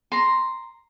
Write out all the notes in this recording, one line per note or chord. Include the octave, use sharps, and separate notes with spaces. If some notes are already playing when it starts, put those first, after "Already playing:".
A#5 C6